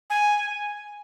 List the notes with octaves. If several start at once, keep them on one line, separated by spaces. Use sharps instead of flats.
G#5